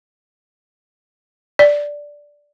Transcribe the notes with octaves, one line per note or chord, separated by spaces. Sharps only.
D5